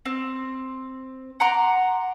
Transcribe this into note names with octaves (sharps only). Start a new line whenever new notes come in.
C4
F#5 A#5 C6 D6